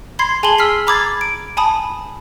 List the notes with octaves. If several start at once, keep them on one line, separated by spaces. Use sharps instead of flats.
B5 C6 G#6 C7
G#4 G#5 A5 C6 F#7 G7
E6 F6 B6 C7
A#5 B5 D6 D#6 G#6 A6
D7
G#5 A5 B5 D#6